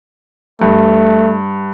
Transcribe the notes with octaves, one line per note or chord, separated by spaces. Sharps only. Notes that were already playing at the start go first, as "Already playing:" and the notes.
G2 A3